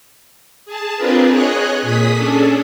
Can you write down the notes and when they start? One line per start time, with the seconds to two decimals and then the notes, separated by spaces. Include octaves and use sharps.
0.65 G#4 A5
0.97 C4 D4 F4 G#4 A#4 B4
1.32 G#4 C#5 D#5 G#5 F#6
1.82 A#2 G#4 D#6 B6
2.14 C#4 D4 G#4 A4